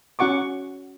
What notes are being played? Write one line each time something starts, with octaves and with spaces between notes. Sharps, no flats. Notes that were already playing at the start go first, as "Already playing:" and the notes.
C#4 F#4 F#5 C#6 D6